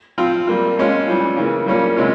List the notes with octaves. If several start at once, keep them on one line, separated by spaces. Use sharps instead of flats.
F3 C4 F4
G3 A#3 F4
F3 G#3 C#4 F4
E3 G3 C#4 F4
C#3 E3 A#3
G3 A#3 C#4 F4
C3 E3 G#3 C#4 F4